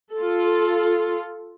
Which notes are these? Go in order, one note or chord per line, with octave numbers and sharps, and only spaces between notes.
F4 A4